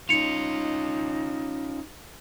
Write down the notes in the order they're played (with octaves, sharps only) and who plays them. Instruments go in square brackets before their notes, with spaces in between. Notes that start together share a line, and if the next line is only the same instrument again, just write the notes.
[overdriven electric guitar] C#4 F4 [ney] D#4 [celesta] C#7 F7